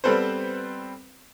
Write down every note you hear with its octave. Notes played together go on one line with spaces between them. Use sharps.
G3 B3 C4 A4 B4 C5